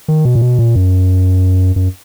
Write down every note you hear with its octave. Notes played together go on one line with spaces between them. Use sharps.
D#3
B2
A#2
B2
A#2
F#2
F#2